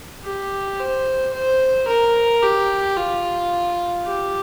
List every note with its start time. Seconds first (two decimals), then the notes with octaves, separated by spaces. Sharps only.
0.24 G4
0.80 C5
1.33 C5
1.88 A#4
2.42 G4
2.96 F4
4.06 G4